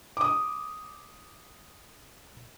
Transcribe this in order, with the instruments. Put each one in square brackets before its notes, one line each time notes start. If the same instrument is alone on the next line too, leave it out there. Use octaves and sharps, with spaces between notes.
[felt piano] D6 D#6